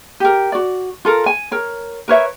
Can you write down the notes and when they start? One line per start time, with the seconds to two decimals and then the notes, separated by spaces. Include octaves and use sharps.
0.20 G4 A#4
0.52 F#4 D5
1.05 F4 A4 A#4
1.26 G#5
1.51 A#4 C#5
2.08 A#4 B4 C#5 E5